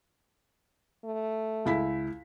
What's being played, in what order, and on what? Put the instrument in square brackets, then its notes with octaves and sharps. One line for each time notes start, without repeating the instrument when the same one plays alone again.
[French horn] A3
[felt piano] C#2 E4 B6